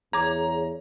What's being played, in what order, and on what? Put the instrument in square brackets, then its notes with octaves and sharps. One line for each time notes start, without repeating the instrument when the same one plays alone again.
[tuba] E2 [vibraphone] G#4 C#5 [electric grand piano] A#5 [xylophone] D6 G#6